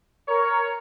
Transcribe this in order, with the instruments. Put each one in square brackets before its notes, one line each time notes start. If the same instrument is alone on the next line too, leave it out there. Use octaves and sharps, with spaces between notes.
[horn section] A#4 C#5